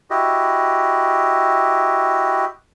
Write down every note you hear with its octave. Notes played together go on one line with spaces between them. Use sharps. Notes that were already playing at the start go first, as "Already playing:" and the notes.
E4 F#4 G4 D#5